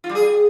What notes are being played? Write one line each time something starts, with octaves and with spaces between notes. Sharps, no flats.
F4
G3
G#4